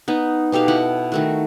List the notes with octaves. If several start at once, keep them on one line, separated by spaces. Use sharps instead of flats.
B3 D#4
B2 G4 A4 F5
E4 F#5
D#3 A3 F#4